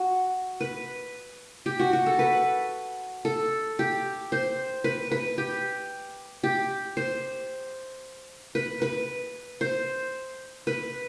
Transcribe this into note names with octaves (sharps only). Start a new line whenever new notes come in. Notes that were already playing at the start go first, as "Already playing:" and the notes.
Already playing: F#4
B4
G4
F#4
F#4
A4
B4
A4
G4
C5
B4
B4
G4
G4
C5
B4
B4
C5
B4